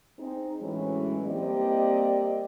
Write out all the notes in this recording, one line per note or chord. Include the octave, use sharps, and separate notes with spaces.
C4 D#4 G#4
A2 E3 F#3 G#3 C#4
G3 A#3 C4 G4 D5 D#5